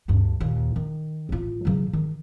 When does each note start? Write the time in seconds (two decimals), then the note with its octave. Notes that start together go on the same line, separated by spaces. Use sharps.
0.08 D2 G2
0.41 D#2 A#2
0.76 D#3
1.29 A1 F4
1.65 C#3 F#3
1.93 D#3